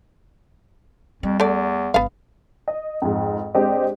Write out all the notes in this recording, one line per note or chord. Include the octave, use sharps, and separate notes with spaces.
F2 G3
E2 A3 D5
G1 B3 F5
D#5
F2 G#2
G#3 C4 D4 G4 C5 D#5